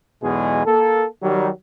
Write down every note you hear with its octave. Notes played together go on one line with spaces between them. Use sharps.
B1 E2 B2 G#3 G#4
A#3 A4
D#3 F#3 G3